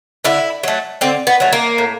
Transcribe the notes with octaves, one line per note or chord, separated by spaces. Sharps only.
D3 E4
F#3 A3
D3 C4
B3
F#3 A3
A#3
A2